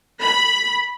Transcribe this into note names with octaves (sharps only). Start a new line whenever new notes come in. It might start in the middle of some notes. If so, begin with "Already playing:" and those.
B5